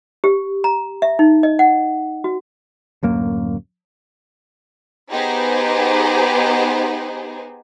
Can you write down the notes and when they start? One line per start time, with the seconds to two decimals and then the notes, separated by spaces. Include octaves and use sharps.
0.24 G4
0.64 A#5
1.02 E5
1.19 D#4
1.43 D#5
1.59 F#5
2.24 F#4
3.03 D1 F#2 A#3
5.12 B3 D#4 G4 G#4 C5